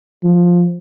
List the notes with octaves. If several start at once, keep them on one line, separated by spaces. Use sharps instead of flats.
F3